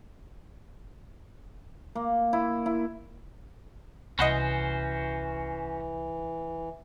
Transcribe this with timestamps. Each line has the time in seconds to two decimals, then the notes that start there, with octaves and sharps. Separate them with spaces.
1.95 A#3
2.33 E4
2.66 E4
4.19 C2 E3 C#4 F#4 C5 D#5 F#5 B5